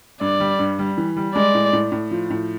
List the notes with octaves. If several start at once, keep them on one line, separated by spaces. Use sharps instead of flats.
G2 D5
G3
G2
G3
E3
G3
G#3 D5
A2
A2
A2
F3
A2